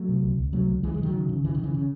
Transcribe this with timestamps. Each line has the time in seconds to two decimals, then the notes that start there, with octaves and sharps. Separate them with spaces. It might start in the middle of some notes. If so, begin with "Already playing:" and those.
Already playing: F#3 A3
0.09 C3
0.23 C#2
0.39 C#2
0.53 C3 F#3 A3
0.69 C#2
0.83 C#2 E3 G#3
0.94 E3 G#3
0.98 C#3
1.03 D#3 F#3
1.14 C#3
1.29 C#3
1.44 C#3 E3
1.54 D#3
1.59 C#3
1.64 E3
1.74 C#3